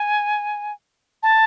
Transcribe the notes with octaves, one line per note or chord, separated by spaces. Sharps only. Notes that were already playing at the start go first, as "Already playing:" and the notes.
Already playing: G#5
A5